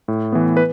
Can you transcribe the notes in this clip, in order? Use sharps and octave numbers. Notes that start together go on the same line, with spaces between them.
A2
E3 B3
B4